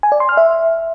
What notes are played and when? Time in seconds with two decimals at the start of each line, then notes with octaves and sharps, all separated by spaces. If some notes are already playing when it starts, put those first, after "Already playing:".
0.03 G#5
0.12 D5
0.20 C6
0.29 F6
0.37 E5